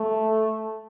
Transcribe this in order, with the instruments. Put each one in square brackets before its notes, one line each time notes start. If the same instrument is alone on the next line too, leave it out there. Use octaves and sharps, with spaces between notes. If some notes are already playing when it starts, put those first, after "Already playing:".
Already playing: [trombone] A3